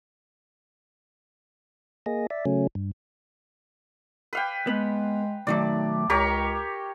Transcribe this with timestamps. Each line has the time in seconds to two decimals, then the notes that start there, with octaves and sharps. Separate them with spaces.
2.06 A#3 G#4 D#5
2.30 D5 E5
2.46 C#3 F#3 A3 C#4
2.75 G2
4.33 B4 F5 G5
4.67 G#3 B3
5.47 B1 D#3 F#3 A3 D5
6.10 C#2 G4 A#4 C#5 A#5